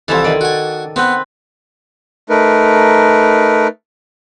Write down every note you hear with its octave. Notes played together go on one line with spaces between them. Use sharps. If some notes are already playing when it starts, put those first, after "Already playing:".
C2 E3 F3 E4 A4
D#3 D5
F#4 G#5
B3 C4 B4
A3 D#4 A#4 B4